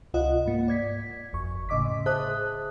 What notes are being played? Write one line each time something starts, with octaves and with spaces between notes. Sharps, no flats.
C#2 C3 F4 D#5 F#5
G#2 A#3
D5 G#6 B6
G1 F2 C#6
A2 C#3 D#5 D6 B6
G#4 C5 E5 A5 D#6 F#6